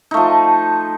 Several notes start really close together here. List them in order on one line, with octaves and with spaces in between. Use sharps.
D#4 A3 F3